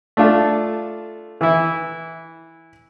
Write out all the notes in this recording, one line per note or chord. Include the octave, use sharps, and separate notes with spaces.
A3 D4 F4 A4
E3 E4